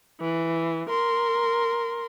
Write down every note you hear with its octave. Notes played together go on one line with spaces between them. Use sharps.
E3
A#4 C6